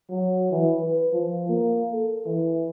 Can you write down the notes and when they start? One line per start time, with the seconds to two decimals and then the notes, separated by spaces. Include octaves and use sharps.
0.10 F#3
0.52 E3
0.81 B4
1.13 F3
1.49 A#3
1.93 A4
2.26 E3